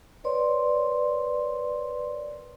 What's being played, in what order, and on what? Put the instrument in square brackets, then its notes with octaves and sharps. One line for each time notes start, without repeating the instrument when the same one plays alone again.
[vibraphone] A#4 B4 C#5 D5 C6